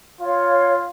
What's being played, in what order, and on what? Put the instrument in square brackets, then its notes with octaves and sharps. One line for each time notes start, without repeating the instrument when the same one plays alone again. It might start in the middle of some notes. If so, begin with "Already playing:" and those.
[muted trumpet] F4 [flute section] C#5 F5